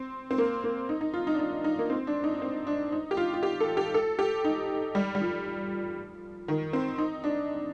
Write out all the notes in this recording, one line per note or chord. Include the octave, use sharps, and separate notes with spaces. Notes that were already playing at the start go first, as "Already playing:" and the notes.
Already playing: C4
C4
A#3
A#3
D#4
D#4
F4
D#4
D4
D#4
D#4
A#3
C4
D4
D#4
C4
D4
D#4
G4
F4
F4
G4
A4
G4
A4
G4
D#4
G3
G3
F3
D#3
C4
D#4
D4